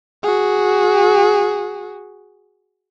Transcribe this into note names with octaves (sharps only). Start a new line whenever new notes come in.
F#4 G#4